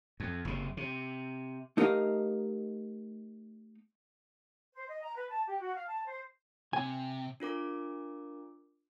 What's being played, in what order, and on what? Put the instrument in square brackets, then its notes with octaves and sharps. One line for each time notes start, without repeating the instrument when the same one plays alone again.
[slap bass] F2
F#1 C3
C3
[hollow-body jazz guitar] A3 D#4 G4 A#4 D#5 F5
[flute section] C5
D#5
A#5
B4
A5
G4
F#4
F5
A5
C5
[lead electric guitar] C3 [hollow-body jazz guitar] G#5
[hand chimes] D4 F4 A#4 D6